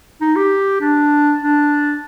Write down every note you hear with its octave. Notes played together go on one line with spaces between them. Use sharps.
D#4
G4
D4
D4